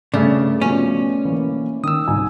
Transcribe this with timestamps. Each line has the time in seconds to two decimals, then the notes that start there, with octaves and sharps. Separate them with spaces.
0.14 G2 C#3 A3 D5
0.62 B2 F3 C#4
1.25 E3 A#3
1.84 D#3 D#6 E6
2.08 C2 D#4 G#5